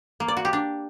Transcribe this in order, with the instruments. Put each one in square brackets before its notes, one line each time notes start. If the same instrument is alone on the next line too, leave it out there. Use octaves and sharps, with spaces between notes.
[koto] A#3
D5
F#4
G4
D4